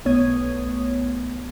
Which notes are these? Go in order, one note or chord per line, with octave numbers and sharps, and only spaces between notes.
B1 A3 B3 C#5 D#6 G#6